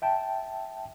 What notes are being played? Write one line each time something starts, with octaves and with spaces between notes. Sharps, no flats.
E5 G5 A5